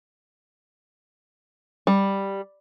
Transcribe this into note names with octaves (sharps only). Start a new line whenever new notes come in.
G3